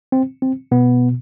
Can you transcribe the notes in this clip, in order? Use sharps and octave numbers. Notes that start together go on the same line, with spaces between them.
C4
C4
B2 B3